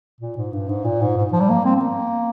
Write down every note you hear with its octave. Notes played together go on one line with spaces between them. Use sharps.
A#2
G#2
G2
G#2
A#2
G#2
G#2
F3
G3
A#3
C4
C4
A#3